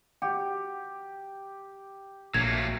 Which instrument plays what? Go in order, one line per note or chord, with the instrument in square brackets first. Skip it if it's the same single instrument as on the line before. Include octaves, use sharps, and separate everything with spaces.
[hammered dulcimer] G4 [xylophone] F#5
[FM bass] A#1 [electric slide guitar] F#3 A3 A#3 [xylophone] G#6